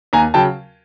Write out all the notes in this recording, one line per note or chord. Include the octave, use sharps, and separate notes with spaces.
D#2 G#5 A#5
C#3 F#3 G5 A5